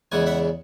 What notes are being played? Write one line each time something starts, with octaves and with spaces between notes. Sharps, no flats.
E2 C#3 E3 G#3 F#5 G#5
E5 F#5